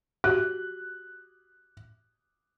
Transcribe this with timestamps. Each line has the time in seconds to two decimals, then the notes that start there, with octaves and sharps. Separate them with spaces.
0.24 F#4 G4 F#6